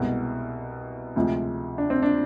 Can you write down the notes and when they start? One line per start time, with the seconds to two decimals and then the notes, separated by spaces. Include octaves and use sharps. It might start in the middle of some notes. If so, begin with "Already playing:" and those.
Already playing: C2 B2 G#3
1.16 D2 C3 F3 G#3
1.78 D4
1.90 C4
2.02 D4